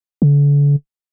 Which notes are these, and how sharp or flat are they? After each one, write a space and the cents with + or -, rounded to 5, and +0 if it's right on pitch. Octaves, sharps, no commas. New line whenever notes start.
D3 -40